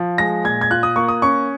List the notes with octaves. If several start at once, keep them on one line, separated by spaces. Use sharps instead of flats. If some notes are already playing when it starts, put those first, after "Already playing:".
Already playing: F3
G#3 A#6
A#2 G#6
G#6
F4 F#6
D#6
A#3 C#6
D#6
C#4 C#6